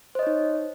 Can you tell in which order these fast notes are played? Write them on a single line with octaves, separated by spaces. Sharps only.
C5 D#5 C#5 D#4